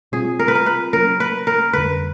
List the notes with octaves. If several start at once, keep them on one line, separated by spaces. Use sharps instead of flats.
B2 G3 C4 F4 G#4
A#4
B4
A#4
B4
F#3 A#3 C#4 A#4
B4
A#4
F2 D3 G3 B4